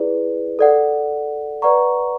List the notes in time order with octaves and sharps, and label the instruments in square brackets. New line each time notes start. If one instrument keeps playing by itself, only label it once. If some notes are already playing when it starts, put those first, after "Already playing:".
Already playing: [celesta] E4 G#4 B4 D5
A4 D5 F#5
B4 D5 F#5 A#5 C#6